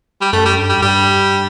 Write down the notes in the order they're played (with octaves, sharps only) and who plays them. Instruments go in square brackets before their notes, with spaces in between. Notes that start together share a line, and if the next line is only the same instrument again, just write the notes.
[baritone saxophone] G3
[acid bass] F#2 [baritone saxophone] A3
[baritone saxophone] G3
[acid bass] G2
[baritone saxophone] G3
[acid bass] G2 [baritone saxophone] G3